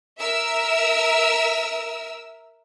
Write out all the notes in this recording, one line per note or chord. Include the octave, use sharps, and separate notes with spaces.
A#4 E5 E6